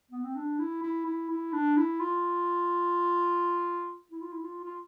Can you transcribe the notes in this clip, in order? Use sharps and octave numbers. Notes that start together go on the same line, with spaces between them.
B3
C4
D4
E4
E4
E4
E4
D4
E4
F4
E4
F4
E4
F4
F4